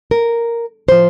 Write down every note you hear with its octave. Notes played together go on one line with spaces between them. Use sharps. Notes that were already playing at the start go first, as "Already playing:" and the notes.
A#4
A2 F3 C5